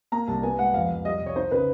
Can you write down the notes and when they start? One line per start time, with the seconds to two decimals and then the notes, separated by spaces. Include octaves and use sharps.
0.12 A#3 A#5
0.28 C2 A5
0.43 B3 G#5
0.59 G#2 F#5
0.74 F2 F5
0.89 F2
1.05 G3 D#5
1.21 C2
1.26 C#5
1.36 D#4 C5
1.51 C#3 B4